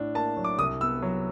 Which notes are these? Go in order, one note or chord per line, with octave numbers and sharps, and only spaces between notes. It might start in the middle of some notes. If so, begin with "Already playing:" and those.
Already playing: A2 D4
A#3 A5
F#3
D6
C2 D#6
B3 E6
F#3